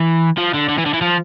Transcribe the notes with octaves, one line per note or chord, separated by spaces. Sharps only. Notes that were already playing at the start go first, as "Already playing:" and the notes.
Already playing: E3
F3
D3
D3
E3
D3
E3
F3